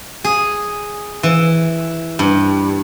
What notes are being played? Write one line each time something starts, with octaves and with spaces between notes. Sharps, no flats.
G#4
E3
G2